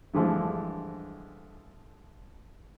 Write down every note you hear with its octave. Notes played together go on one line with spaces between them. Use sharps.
G2 D3 E3 F3 G#3 A3